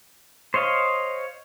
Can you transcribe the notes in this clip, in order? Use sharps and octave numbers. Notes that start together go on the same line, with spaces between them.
C5 C#5 D#5 F5